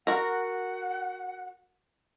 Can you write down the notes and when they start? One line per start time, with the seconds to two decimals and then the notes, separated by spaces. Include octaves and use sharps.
0.07 F#4 A#4 F#5